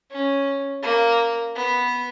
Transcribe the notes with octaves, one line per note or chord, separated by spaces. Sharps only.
C#4
A#3
B3